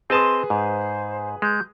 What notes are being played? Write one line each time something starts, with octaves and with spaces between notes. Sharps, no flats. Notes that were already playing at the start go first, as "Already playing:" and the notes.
C4 G#4 B4 D#5 A5 C6 D#6
G#2 C5
G#3 G6